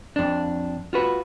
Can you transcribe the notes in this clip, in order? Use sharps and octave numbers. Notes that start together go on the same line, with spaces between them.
F2 D4
F4 F#4 B4